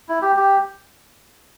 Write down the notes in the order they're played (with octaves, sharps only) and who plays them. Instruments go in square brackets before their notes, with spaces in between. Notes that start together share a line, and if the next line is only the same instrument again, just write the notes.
[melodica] E4
G4
G4